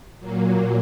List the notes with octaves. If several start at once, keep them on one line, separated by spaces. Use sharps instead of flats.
A#2 F#3 A#3